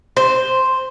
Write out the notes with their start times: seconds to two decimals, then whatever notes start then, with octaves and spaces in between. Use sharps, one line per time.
0.17 C5